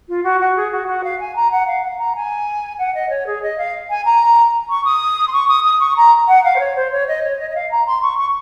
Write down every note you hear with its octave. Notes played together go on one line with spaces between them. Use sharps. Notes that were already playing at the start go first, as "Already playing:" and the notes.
F4
F#4
F#4
G#4
F#4
F#4
F5
G#5
A#5
F#5
F5
F#5
A#5
G#5
F#5
D#5
C#5
G#4
D#5
F5
G#5
A#5
C#6
D#6
C6
C#6
D#6
D#6
C#6
A#5
F#5
F5
C5
C#5
C5
C#5
D#5
C#5
D#5
D#5
F5
A#5
C6
C#6
C#6